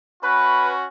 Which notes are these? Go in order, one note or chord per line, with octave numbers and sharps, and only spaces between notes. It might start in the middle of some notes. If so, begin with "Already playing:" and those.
C#4 F#4 B4